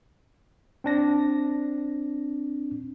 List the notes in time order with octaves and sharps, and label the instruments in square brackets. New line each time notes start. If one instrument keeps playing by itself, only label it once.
[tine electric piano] C4 D4 A#6